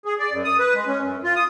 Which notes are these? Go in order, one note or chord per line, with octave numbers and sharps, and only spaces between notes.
G#4
D5
F#2
D#6
B4
G#3
C#4
F#2
F4
D#6